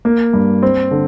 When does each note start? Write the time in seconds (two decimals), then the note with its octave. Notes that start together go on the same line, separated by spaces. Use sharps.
0.05 A#3
0.33 G2
0.63 C4
0.91 D3